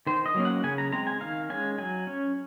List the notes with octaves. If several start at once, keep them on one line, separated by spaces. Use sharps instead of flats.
D#3 C5
D#5
F#3 A#3 C#4
F#5
C#3 G#5
A#5
G#3 C4 A#5
G#5
D#3 F5
G#3 C#4 G#5
F#3 G#5
C#4